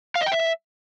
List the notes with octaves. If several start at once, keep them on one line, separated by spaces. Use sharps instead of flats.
F5
D#5
G5
E5